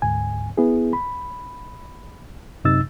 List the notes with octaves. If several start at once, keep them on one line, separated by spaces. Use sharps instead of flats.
D2 G#2 G#5
B3 E4 G#4
B5
F#2 C3 D#4 E6 A6